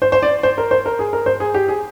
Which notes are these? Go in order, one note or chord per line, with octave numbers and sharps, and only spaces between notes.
C5
C5
D5
C5
A#4
C5
A#4
G#4
A#4
C5
G#4
G4
G#4